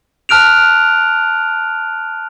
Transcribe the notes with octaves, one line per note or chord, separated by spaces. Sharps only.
A5 F6 F#6 D7 F7